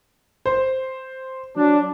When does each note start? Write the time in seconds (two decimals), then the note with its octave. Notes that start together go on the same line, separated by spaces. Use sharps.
0.46 C5
1.56 F#3 D4